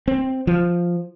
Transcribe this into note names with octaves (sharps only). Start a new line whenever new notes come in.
C4
F3